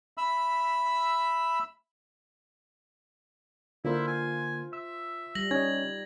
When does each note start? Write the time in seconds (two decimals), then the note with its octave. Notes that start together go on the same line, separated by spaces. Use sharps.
0.18 E5 B5 E6
3.85 D3 A#3 E4 F4 C5
4.07 G#5
4.73 E5 E6
5.35 G3 A#6 F#7
5.51 C#4 D#4 D#5 G#6